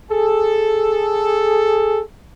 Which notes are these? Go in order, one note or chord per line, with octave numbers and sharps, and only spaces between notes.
G#4 A4